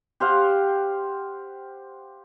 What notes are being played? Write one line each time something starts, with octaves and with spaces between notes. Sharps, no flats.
G4 C5 F5 F#5